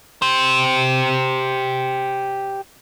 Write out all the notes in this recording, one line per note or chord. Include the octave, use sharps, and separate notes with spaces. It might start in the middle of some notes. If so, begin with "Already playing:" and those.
G4 C5